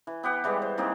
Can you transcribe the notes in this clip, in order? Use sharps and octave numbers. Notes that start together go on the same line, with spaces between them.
E3
B3 G4 F#5
E3 G3 G#3 B3
C5
E3 A#3 C4 D#4